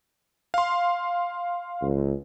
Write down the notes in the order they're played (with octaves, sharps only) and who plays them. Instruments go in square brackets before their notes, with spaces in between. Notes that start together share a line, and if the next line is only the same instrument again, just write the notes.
[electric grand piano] F5 C6
[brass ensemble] C#2